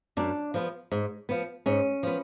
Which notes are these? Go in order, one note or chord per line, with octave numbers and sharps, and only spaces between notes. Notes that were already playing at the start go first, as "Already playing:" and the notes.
F#2 D4
F3 B3
G#2
F3 B3
G#2 C#4
F3 B3